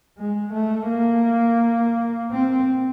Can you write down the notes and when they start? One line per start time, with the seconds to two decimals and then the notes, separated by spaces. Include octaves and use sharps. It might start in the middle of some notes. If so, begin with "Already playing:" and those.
0.18 G#3
0.53 A3
0.89 A#3
2.32 C4